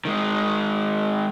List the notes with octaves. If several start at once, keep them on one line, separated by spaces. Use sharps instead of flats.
D#3 G#3